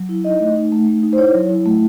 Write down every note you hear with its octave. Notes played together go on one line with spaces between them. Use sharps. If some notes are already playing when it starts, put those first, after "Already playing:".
Already playing: F#3
E4
D#4 D#5
A3
D#4
A3
A3
D#4
C5
E4 C#5
F#3
E4
A3